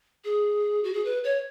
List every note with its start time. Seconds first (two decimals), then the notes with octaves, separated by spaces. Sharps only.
0.24 G#4
0.84 F#4
0.93 G#4
1.05 B4
1.24 C#5